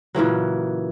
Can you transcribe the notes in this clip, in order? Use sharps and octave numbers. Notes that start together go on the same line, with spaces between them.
A#2 C#3 E3 F#3